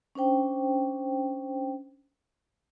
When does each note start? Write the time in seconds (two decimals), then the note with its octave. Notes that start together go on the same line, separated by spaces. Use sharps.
0.15 C#4 D4 C5 G5